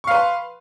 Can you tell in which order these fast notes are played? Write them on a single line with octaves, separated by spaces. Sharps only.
C#6 F5 B4 C6